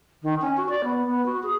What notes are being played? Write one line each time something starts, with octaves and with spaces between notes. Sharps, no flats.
D#3
C#4
F#4
D5
B3
B3
F#4
G#4